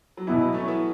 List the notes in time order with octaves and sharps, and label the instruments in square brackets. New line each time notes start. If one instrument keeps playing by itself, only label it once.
[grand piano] F#3
[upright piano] B2 B3 E4 [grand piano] E3
[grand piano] F#3
A3 C#4
B3 E4